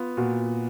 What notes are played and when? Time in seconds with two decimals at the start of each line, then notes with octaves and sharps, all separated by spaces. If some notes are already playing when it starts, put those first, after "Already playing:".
Already playing: B3 F4
0.17 A#2 F#4